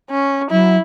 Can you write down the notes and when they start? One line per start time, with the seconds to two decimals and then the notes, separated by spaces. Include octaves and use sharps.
0.11 C#4
0.51 F#3 E4